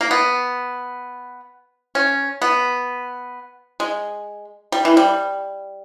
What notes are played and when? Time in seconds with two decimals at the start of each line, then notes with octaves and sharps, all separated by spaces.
0.01 A#3
0.11 B3
1.95 C#4
2.42 B3
3.80 G#3
4.72 G3
4.85 E3
4.97 G3